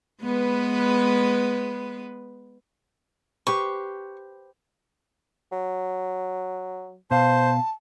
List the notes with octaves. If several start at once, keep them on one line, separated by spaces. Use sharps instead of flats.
G#3 B3 B4
G4 B4 C5 C#6
F#3
B2 C5 F5 A5